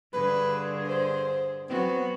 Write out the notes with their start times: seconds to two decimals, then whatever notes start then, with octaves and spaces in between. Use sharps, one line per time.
0.13 G2 D3 G#4 B4
0.88 C5
1.69 F#3 B3 C4 F#4